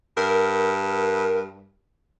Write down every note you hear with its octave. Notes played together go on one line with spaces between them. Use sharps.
G2 A#4